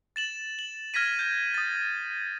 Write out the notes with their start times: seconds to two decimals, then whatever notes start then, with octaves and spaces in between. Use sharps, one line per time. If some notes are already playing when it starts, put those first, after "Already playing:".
0.16 A6 E7 F#7
0.59 F#7
0.94 F6 G#6 A#6 B6 D#7
1.19 G6 D#7
1.54 D#6 A6